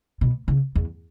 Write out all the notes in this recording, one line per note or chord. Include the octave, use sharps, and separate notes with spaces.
B2
C#3
E2